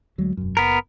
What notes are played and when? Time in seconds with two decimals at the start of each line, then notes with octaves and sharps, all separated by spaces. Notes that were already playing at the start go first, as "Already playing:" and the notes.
0.18 D2 F#3 G#3
0.37 E1 F#2
0.57 F#1 B3 A#4